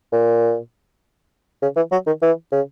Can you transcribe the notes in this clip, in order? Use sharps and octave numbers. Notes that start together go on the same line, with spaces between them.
A#2
C#3
E3
F#3
D#3
E3
C#3